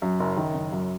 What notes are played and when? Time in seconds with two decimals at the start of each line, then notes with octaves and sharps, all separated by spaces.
0.02 F#2
0.20 F#1
0.37 D#3
0.54 F#1
0.72 F#2